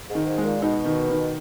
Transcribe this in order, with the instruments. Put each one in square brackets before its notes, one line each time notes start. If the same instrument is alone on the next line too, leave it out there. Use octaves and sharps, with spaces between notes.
[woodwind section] G#2
[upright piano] D#3
[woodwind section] G#2
[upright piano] G#3
[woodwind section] A#2
[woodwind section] B2 [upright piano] D#4
[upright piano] D#3
D#3